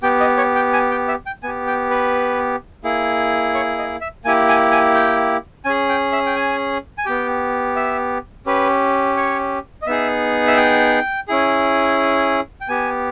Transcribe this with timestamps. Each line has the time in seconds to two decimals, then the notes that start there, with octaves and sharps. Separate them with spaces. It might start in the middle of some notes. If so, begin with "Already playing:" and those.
0.03 B3 G4 G5
0.20 D#5
0.37 C#5
0.55 G5
0.73 G#5
0.91 G5
1.08 E5
1.26 G5
1.43 B3 G4 G#5
1.67 G5
1.90 B4
2.84 A#3 E4 G#4
3.54 C#5
3.78 D#5
4.01 E5
4.25 A#3 E4 G4 G#5
4.49 G#5
4.72 G#5
4.95 G5
5.65 C#4 G#4 G#5
5.89 G5
6.12 E5
6.26 G5
6.36 G#5
6.98 G#5
7.06 B3 G4 G5
7.76 E5
8.46 C#4 G4 B4
9.16 C#5
9.82 D#5
9.86 B3 D#4 G#4 E5
10.47 E5
10.57 G5
11.28 C#4 E4 G#4
12.61 G5
12.68 B3 G4 G#5